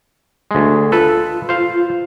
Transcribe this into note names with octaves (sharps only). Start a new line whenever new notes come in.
D2 G#3
F4 A4 B4
C5 F5